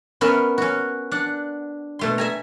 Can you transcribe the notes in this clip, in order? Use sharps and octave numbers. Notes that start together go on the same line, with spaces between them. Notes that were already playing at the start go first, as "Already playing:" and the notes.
B3 C#4 A#4 E5
C#4 F#4
D4 F#5
B2 A3 C6
E5 G#5 A#5